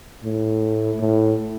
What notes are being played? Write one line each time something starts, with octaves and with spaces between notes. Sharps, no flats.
A2
A2